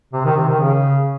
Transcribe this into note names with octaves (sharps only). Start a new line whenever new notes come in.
C3
D#3
C3
D#3
C#3